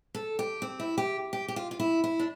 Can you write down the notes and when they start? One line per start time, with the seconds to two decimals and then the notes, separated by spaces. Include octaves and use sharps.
0.15 A4
0.39 G4
0.62 C4
0.80 E4
0.98 G4
1.33 G4
1.48 G4
1.56 F4
1.71 F4
1.80 E4
2.04 E4
2.19 D4